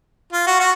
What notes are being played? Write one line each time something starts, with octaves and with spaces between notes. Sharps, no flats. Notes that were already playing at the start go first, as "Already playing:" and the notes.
F4
F#4
F#4